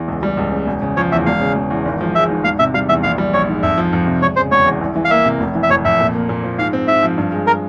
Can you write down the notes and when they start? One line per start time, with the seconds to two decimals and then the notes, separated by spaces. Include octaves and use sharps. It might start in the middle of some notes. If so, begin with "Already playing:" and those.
Already playing: E2
0.08 C#2
0.23 G3
0.37 C#2
0.52 C#3
0.67 E1
0.82 C#3
0.96 F3 C#5
1.12 E2 E5
1.26 E1 F5
1.41 C#3
1.56 E1
1.71 E2
1.85 G#1
2.01 F3
2.15 G#3 E5
2.30 G#2
2.44 E1 F5
2.59 C3 E5
2.74 G3 F5
2.89 E2 E5
3.03 A#1 F5
3.18 G3
3.33 A#1 C#5
3.47 G#2
3.62 F2 E5
3.78 F3
3.93 F2
4.07 C3
4.22 E1 C#5
4.36 C#3 C5
4.51 E1 C#5
4.66 E2
4.81 C2
4.96 E3
5.05 F5
5.10 A#3 E5
5.26 C3
5.40 F1
5.55 E3
5.63 E5
5.70 F1 C#5
5.85 F2 E5
6.00 A#2
6.14 A#3
6.29 A#2
6.43 F3
6.58 G#2 F5
6.73 C4
6.88 G#2 E5
7.03 F3
7.18 G2
7.32 G#3
7.47 A#4